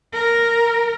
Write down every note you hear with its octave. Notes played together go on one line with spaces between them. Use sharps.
A#4